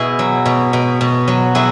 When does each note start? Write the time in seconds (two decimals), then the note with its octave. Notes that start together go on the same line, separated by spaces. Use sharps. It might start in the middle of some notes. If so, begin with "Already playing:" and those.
Already playing: B2 E4 G#4
0.19 F#3
0.45 B2
0.73 B2
1.01 B2
1.28 F#3
1.55 F#3 E4 G#4